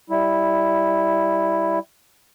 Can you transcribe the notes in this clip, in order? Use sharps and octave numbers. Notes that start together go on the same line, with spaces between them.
G3 E4